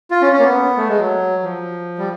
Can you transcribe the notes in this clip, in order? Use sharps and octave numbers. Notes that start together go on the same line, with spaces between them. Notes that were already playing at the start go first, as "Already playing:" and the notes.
F4
C#4
C#4
A#3
B3
A3
G#3
F#3
F3
G3